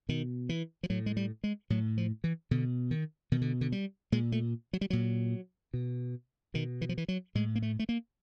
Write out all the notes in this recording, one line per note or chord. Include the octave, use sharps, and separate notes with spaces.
B2 D#3
E3
F3
A2 F#3
G#3
G3
G#3
A2 F#3
F3
E3
B2 D3
D#3
B2 D#3
D3
D3
G3
A#2 G#3
A3
F#3
G3
A#2 F#3
B2
B2 D#3
E3
F3
E3
F#3
A2 G#3
A#3
A3
A3
A#3